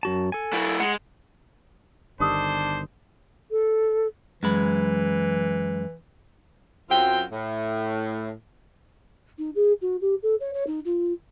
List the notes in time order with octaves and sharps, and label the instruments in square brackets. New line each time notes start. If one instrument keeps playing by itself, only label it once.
[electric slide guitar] F#2 F#4 A5
A4 G#5
[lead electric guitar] F#3 E4
[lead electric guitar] G#3 [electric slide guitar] F#5
[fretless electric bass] G1 D3 D#3 [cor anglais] D4 [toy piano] G4 D#6 E6 [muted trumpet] C5
[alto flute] A4
[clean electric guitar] F#2 G#3 B5 [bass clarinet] E3
[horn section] F#2 F#3 C4 F4 G5
A2
[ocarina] D#4
G#4
F#4
G4
A4
C#5
C#5
D#4
F4